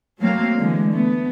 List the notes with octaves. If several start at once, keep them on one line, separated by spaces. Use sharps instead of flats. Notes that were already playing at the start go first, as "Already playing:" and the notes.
F#3 A3 A#3 C4 F5
D3 E3 G#3
A3 B3